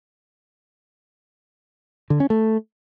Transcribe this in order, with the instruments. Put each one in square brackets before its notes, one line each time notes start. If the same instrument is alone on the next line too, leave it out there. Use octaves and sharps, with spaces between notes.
[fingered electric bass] D3
C#4
A3